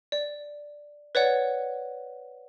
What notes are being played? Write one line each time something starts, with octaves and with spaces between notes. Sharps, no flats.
D5
B4 C#5 D5 F#5